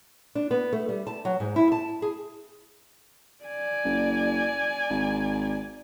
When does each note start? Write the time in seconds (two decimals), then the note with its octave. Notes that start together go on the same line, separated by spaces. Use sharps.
0.35 D4
0.51 B3
0.73 A3
0.89 G3
1.07 A5
1.25 F#3
1.40 G#2
1.56 E4
1.72 A5
2.02 G#4
3.44 D5 G#5
3.85 F#1
4.90 G#1